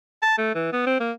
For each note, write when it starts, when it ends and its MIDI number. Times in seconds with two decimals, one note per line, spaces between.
0.23 0.35 81
0.38 0.54 57
0.55 0.69 52
0.73 0.83 59
0.86 0.97 60
1.00 1.12 58